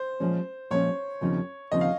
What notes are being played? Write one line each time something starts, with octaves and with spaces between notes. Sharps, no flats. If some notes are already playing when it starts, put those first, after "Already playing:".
Already playing: C5
A#2 F3 G#3 C#4
A#2 F3 G#3 C#4 C#5
D#2 C#3 F3 C4 D#4
D#2 C#3 F3 C4 D#4 D#5
F5